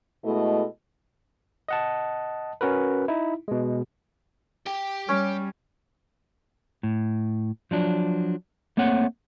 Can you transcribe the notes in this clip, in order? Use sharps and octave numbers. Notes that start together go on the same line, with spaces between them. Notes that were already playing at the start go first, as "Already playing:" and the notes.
B2 G#3 A3 E4 A4 D#5
D#5 F#5 A5
C#4 F#4 A#4 B4
D#4 E4
B2 G#3
G4 G5
G3 C#4
A2
F3 F#3 D4
A3 A#3 C4 C#5 F#5